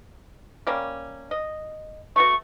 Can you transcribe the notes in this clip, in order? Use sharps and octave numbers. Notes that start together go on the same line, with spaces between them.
G3 A#3 C#4
D#5
A3 B3 F#4 C#6